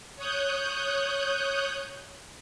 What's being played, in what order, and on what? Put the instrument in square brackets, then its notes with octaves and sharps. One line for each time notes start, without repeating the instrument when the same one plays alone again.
[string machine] C#5 D#6 F#6 G6